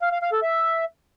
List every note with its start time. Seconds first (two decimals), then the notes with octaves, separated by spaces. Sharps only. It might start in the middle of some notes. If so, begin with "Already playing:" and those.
0.02 F5
0.12 F5
0.22 F5
0.32 A4
0.42 E5